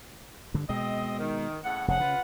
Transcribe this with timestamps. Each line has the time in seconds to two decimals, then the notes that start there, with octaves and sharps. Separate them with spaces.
0.54 G2 D3
0.69 B2 G#3 C4 C5 D#5
1.19 D#3
1.64 A2 C#3 F#5
1.88 F1 G#2 C#3 F#5
2.00 C#3 F4 B4